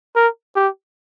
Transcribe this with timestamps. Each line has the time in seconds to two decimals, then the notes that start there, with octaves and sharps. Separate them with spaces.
0.16 A#4
0.56 G4